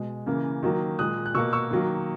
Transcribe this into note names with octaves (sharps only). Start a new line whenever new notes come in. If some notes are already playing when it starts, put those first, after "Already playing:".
Already playing: B2 G#3
C#3 E3 A#3
D#3 F#3 A#3
A#2 G#3 D#6 F#6
F#6
B2 A#3 C#6 E6
C#6 E6
D#3 F#3 A#3